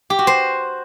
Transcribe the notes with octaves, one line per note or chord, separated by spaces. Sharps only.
G4
F#4
C5